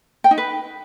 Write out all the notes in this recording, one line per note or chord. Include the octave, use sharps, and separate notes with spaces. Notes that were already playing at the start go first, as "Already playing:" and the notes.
G5
D#4
B4